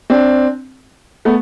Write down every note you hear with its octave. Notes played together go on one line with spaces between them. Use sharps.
C4 D4
A3 B3